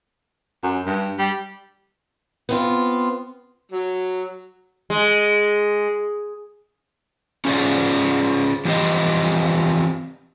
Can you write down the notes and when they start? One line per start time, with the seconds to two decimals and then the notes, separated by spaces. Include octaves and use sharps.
0.63 F#2
0.86 G2
1.19 G3
2.49 B3 C4 F4
3.72 F#3
4.90 G#3
7.45 C#4 F4 G#4 C5 D5
8.65 E3 F3 C4 G4 D#5